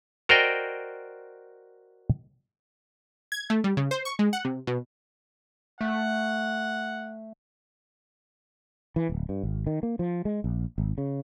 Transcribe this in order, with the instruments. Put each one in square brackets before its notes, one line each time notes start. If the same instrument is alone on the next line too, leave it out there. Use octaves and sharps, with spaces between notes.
[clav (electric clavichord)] F#4 A#4 C5 D5 D#5 G5
[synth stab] G#6
A3
G3
C#3
C5
C#6
G#3
F#5
C3
B2
[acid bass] A3 [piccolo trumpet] F#5
[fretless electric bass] E3
D1
G2
G#1
D#3
A#3
F3
G#3
A#1
G#1
C#3